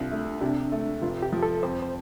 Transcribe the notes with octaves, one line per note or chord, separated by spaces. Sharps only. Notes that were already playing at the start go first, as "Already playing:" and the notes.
Already playing: C2 D4 F4
A3
C3 D4
A3
F1 F4
G4
F3
A4
F2 C5
C5